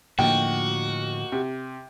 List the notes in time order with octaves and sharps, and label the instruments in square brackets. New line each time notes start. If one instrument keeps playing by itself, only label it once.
[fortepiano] D#2 [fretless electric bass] A2 D3 F3 [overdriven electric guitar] F#4 [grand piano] G5
[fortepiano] C3